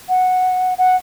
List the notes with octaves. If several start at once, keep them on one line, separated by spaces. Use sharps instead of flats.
F#5
F#5